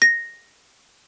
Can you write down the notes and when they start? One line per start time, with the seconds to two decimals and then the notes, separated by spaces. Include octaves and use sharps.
0.02 A#6